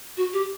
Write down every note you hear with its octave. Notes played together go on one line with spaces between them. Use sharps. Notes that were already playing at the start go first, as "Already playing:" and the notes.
F#4
G4